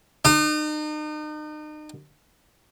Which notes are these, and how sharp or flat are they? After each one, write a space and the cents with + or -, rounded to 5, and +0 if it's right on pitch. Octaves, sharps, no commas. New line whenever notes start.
D#4 -40